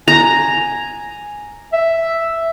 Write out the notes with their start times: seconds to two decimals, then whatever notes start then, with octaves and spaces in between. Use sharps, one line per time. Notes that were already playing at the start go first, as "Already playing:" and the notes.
0.08 G#5 A#5
1.73 E5